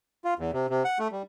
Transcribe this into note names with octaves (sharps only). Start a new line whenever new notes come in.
F4
E2
C3
C3
F#5
A3
G3